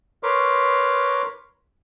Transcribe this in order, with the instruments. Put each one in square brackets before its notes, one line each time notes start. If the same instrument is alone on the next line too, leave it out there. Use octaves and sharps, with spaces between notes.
[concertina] A#4 B4 C#5 C6 D6